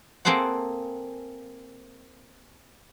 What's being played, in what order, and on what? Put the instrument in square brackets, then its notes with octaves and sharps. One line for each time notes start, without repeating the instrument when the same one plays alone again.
[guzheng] A#3 C4 G#4 A4 C5 F#5